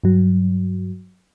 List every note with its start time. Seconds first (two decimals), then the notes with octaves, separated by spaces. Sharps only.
0.04 G2 F#3